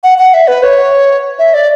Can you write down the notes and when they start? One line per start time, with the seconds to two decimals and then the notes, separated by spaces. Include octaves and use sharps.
0.03 F#5
0.18 F#5
0.34 E5
0.48 B4
0.63 C#5
1.39 E5
1.54 D5